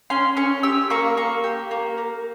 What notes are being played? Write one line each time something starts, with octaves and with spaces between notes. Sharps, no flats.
C#4 C6
C#4 C#6
G4 E6
A#3 C#6
A#3 C#6
G4
A#3
A#3